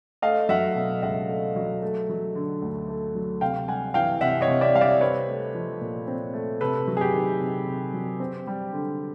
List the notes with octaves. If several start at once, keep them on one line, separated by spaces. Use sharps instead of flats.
A3 D#5 F5
F#3 E5 F#5
B2
C#2 E5 F#5
A3
F#3
A3
F#3
D3
D2
A3
F#3
C3 F5 G5
G3 F#5 G#5
E3 F5 G5
C3 E5 F#5
C#5 D#5
C3
D5 E5
G3 F5
D5 E5
C4 B4 C#5
A3
F3
A#2
C4
A3
C3 A4 B4
F#3
G#4
G4
D#3
C3
C3
F#3
C4
G3
D3